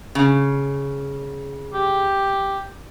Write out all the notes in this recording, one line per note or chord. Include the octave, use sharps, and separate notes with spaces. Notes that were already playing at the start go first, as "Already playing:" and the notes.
C#3
G4